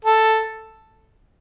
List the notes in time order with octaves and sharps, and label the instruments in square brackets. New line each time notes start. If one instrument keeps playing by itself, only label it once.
[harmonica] A4